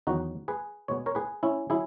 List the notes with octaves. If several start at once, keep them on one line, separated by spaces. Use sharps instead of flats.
E2 D#3 F#3 D#4 F#4
G#4 B4
B2 G#3 B3 C#5
A#4 C#5
G#4 B4
C#4 E4
F#3 E4 G#4